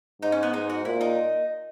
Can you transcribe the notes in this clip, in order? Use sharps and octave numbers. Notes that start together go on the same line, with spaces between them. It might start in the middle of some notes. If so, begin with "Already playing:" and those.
G#2 D#4
C#4
B3
G#2 D#4
F#4
A#2 E4
D#4